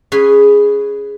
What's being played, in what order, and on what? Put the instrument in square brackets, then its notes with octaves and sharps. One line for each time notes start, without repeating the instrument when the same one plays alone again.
[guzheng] C#4 G#4 B4